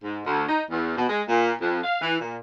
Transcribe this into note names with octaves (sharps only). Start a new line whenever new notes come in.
G#2
D2
D#4
E2
B2
G#3
A#2
F2
F5
E3
A#2